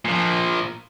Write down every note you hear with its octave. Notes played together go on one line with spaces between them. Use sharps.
A#2 F3